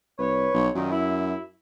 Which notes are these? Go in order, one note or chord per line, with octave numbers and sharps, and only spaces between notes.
C2 B4 C#5
B1
F#2 A#2 D#3
E4